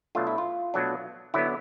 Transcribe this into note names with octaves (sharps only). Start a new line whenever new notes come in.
B2 F#3 A3 D4 F4
E4
F4
B2 F#3 A3 D4
D3 F#3 B3 E4